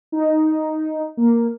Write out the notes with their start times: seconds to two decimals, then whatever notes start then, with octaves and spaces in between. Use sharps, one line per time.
0.12 D#4
1.17 A#3